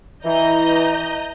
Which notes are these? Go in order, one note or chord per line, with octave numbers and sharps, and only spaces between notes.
E3 D#5 A#5 G6